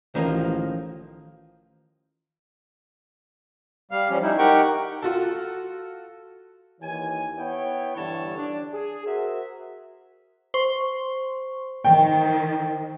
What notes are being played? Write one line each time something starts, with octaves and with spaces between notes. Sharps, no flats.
A1 D#3 F3 A#3
G3 F5 F6
F3 G3 C#4
G3 D#4 E4
D#4 G4 A#4 F#5 G5 C#6
F4 F#4 A4
D#2 E3 C#5 G#5
B3 E4 C#5 G5
G2 D3 E3 C#5 A5
D4
G#4
F#4 A#4 C5 E5
C5 C6 C#6
D#3 G5